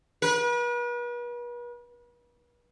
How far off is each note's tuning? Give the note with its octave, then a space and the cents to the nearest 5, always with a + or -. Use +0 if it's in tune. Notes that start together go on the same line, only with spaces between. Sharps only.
B4 -40